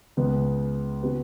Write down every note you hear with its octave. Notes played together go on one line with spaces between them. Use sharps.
C#2 C#3 B3 G#4 B4
C#3 B3 F#4 B4